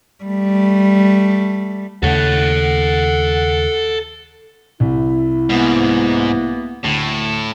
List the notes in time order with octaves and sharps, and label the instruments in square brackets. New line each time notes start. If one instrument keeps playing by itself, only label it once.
[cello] G3 A3
[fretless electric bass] D#2 C#3 A3 [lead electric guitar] A4 C#5 [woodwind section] F#5
[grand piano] C2 [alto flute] E4
[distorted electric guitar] G#2 [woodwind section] E3 A#3 B3
[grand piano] D2 [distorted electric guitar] A2